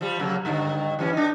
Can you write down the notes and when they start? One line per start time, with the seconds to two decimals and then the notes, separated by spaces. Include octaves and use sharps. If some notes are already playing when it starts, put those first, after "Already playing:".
0.01 F3 G3
0.19 C#3 F#3 A#3
0.45 G2 D3 D#3
0.99 E3 G3 C#4
1.13 D4 D#4